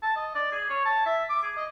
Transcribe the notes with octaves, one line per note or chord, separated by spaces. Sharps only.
A5
D#5
D5
G#4
C#5
A5
E5
D6
G#4
D#5